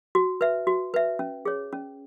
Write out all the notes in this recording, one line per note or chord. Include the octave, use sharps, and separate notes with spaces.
F#4
B4 E5
F#4
B4 E5
C#4
G#4 C#5
C#4